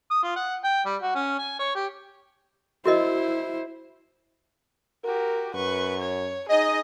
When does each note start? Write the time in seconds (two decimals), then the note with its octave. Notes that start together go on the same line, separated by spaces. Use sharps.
0.11 D#6
0.24 F4
0.36 F#5
0.65 G5
0.86 G3
1.02 F#4
1.15 C#4
1.39 G#5
1.59 C#5
1.75 G4
2.86 E4 F#4 A#4 C5 D#5
5.04 F#4 G4 A#4
5.55 F#2 B4 C#6
6.00 C#5
6.49 D#4 G#4 D#5